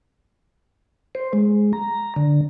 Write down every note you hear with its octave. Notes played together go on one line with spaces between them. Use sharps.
C5
G#3
A#5
D3